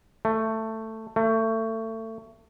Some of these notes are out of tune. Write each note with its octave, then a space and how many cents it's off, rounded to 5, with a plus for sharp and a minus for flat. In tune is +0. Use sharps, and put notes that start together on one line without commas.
A3 +10
A3 +25